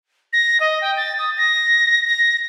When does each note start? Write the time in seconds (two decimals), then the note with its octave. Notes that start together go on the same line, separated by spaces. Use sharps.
0.33 A#6
0.60 D#5
0.81 G5
0.97 A6
1.19 D#6
1.38 A#6
2.07 A#6